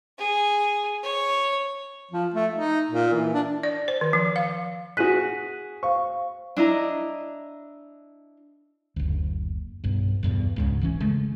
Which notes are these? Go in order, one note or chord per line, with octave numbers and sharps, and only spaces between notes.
G#4
C#5
F3
A3
D#4
A#2
E3
D4
D5
C5
D#3
F3
F5
F#4 G#4 F#6 B6 D#7
C5 F5 C#6
D4 E4 D#5 A#5
F#1 D2
B1 G2
B1 E2 G2 B2
C#2 G#2 C#3
E1 E3 C#4
C#3 G#3 A3